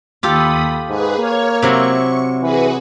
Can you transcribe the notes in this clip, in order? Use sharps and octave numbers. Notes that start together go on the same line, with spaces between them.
D#2 F4 G4 A4 B5 D#6
G#2 G#4 B4
A#3 C#5 F6 G#6
C3 F#3 E4 C#6
E3 F#4 G#4 B4